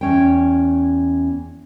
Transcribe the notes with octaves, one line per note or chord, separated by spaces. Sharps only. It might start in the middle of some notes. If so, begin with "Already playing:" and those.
E2 C#4 G5